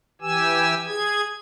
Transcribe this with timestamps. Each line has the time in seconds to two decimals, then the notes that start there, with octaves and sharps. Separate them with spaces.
0.21 E3 G4 G#5 E6
0.87 G#4 G#6